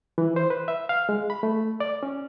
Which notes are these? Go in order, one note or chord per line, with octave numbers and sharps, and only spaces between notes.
E3
C5
B4
E5
F5
G#3
B5
A3
D5
C#4